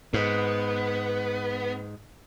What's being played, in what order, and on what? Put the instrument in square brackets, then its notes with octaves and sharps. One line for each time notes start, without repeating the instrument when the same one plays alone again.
[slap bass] G#2 [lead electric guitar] B3